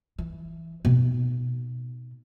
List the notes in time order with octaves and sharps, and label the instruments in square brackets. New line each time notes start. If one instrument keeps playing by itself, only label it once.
[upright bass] E3
B2 D#4